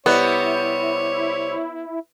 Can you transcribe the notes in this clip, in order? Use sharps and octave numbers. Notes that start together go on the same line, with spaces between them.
C3 G3 B3 E4 C#5